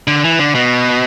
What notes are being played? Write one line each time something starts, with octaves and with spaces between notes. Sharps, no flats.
D3
E3
D3
B2